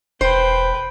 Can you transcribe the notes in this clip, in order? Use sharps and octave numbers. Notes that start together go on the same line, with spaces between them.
E1 B4 C5 G5